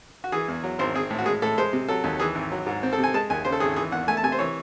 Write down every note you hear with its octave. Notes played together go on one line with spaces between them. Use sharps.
F#4
E3 G#4
E2
F#3
G#1 C5
C4 G#4
A2
F#4
G#3 G#4
A2 A4
G#3 C5
C3
F#3 A4
D#2
E3 G#4
G#1
F#3
G#2
C4
A4
C3
G#5
G#3 A5
D#2 G#5
C#3 C5
A4
G#1 G#4
E3 G#4
E2 F#5
A3 G#5
A5
C3 G#5
C5
E3 C#5